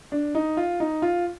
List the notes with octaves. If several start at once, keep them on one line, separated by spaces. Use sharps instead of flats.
D4
D#4
F4
D#4
F4